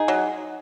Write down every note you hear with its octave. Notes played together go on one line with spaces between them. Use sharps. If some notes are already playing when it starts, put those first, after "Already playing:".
Already playing: D#4 G#4
F#3